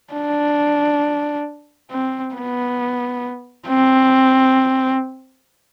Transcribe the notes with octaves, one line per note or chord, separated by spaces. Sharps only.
D4
C4
B3
C4